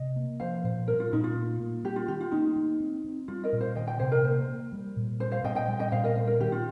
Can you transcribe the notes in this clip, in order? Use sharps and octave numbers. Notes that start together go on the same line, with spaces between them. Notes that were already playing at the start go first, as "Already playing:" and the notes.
Already playing: C3 D#5
A#3
F3 C5 F5
A#2 C5
G3 A#4
F4
A#2 D#4
F4
A#3
A#3
G3 G4
F4
D#3 G4
F4
A#3 D#4
A#3
C4
C4
G3 F4
A#4 D#5
A#2
C5 F5
D#3 D#5 G5
D#5 G5
C3 C5 F5
A#4 D#5
A#3 C5
A#3
G3
A#2
G3 C5
C5 F5
A#2 D#5 G5
D#5 G5
G3
D#5 G5
A#2 C5 F5
A#4 D#5
G3 C5
A#4
D#3 G4
F4